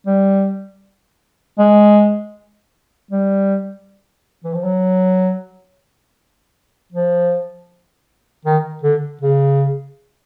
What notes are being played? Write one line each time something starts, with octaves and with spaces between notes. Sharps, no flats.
G3
G#3
G3
E3
F3
F#3
F3
D#3
D3
C#3